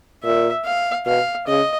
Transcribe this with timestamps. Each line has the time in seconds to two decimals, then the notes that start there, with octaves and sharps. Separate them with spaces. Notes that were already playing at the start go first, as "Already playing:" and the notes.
0.23 A#2 E5
0.65 F5
1.06 B2 F5
1.47 C#3 D#5